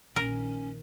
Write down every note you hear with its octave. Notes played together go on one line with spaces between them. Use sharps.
A#1 D#3 C#4 A#4